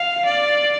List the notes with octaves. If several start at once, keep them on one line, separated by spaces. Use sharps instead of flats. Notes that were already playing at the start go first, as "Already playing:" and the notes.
Already playing: F5
D5